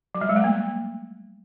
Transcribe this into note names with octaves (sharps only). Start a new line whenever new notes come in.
F#3
G3
G#3
A3
A#3